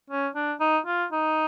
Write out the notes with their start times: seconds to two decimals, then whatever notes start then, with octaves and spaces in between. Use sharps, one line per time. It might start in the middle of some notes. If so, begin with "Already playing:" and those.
0.10 C#4
0.35 D4
0.60 D#4
0.87 F4
1.12 D#4